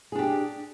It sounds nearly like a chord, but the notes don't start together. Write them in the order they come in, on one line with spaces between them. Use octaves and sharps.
G#4 D4 G4